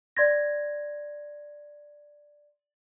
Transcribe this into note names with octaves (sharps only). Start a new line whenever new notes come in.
D5 C6 G#6 A#6